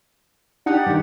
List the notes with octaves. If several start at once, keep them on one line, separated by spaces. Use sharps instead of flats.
D4 D#4 G4 D5 F#5
G2 D#3